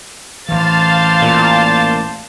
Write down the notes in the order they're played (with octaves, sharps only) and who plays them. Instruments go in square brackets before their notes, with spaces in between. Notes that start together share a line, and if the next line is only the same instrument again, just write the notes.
[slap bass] A1 E3 [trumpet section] C5 A5 D6 [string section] F5 A6
[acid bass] A#2